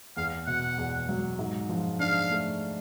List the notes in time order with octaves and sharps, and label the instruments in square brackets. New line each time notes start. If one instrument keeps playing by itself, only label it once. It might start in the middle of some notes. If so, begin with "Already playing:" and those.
[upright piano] E2 [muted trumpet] F5
[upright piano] B2 [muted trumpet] F#5
[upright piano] E2
F#3
G#2
F3
[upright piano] D4 [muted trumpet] F5
[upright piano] A3